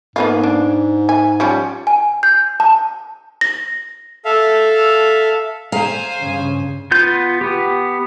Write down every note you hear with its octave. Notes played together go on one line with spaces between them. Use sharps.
G#2 A#3 B3 F4
D4
G#5
F3 G3 C#4
G#5
G6
A5
A#6
A4 E5 F5
G#4 C5 F5 G#5 A#5
G2 C#3
B3 F4 G6
B3 G4